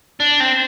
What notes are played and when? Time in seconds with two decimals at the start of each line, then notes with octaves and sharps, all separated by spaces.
0.20 D4
0.40 C4